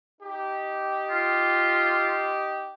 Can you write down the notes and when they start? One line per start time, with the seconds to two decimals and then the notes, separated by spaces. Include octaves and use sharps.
0.22 D#4 G4
1.10 F4